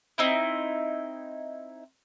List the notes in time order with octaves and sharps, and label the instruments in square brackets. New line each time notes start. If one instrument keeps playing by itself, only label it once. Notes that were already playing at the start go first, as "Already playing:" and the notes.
[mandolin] C4 D#4 E4